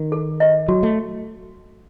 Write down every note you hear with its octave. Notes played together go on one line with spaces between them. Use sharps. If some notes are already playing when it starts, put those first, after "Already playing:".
Already playing: D#3
A4
D#5
F#3 F#4
A3